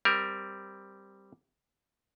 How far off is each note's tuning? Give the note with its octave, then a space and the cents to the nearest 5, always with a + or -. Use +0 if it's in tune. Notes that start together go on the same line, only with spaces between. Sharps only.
G3 +0 C4 +0 A#4 +5